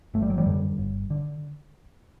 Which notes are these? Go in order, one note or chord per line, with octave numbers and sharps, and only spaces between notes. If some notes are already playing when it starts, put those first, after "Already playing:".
G1 A3
G3
F#3
E3 G3
F#2 D3
G1
D3